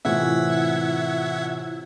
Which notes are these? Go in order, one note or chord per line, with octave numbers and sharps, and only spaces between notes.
A2 C3 E3 E4 F4 E5 F#5 G#6